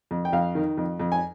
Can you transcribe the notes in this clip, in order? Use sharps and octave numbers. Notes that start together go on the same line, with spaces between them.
F2
G5
F2 F5
D#3
F2
F2
G#5